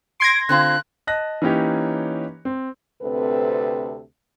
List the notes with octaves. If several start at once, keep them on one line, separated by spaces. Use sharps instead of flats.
C6 G#6 A#6 D7
D3 C4 F4 F#6
D#5 A5 F#6 A#6
E3 A#3 C#4 D#4 G4 C#5
C4
D2 C3 C4 A4 B4